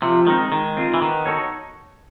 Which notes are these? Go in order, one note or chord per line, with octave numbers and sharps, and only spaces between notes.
C3 F3
D#3 G#3 C4 D#4
D#3 G#3
C4 F4 G#4
E3
D#3 B3
D#4 F#4 A4 C#5